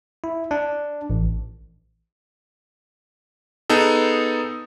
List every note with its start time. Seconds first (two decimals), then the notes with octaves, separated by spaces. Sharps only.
0.24 E4
0.51 D4
1.10 A1
3.70 B3 D#4 G#4 A4